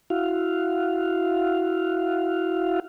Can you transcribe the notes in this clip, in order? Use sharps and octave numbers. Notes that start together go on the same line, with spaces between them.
E4 F#4 F5